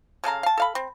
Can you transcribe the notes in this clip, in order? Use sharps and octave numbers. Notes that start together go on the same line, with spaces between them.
C#3 A4 F5 A#5
F5 A5
A4 F5 B5
C4